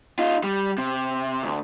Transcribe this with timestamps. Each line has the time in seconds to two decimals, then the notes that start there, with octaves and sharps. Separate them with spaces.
0.19 D#4 F4
0.43 G3
0.78 C3
1.43 D2